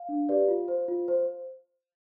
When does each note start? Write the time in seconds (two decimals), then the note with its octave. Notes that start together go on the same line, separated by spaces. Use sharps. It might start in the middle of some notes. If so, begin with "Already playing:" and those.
Already playing: F5
0.09 D4
0.29 G4 B4 D5
0.48 F4
0.68 C5
0.88 F4
1.08 C5